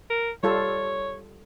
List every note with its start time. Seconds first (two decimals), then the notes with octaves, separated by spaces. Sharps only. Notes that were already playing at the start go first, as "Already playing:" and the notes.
0.10 A#4
0.43 G3 F4 A4 C#5